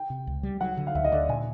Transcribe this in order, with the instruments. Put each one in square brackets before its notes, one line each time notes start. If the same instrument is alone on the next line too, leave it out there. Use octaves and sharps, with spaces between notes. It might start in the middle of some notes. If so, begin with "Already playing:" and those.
Already playing: [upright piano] G5
[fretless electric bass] C3
C#2
G3
[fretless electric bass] F#3 [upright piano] F#5
[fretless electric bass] D3
[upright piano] F5
[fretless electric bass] D2 [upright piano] E5
[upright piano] D#5
[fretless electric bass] D3 [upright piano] D5
[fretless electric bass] A#2 [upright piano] G#5